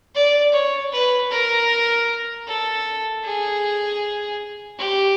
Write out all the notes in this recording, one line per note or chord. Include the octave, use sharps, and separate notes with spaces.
D5
C#5
B4
A#4
A4
G#4
G4